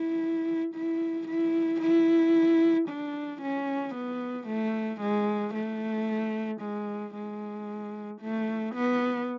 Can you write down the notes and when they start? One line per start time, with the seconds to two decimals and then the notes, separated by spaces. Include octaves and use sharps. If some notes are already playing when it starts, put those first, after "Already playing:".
Already playing: E4
0.75 E4
1.28 E4
1.81 E4
2.89 D4
3.42 C#4
3.95 B3
4.48 A3
5.02 G#3
5.55 A3
6.61 G#3
7.14 G#3
8.21 A3
8.75 B3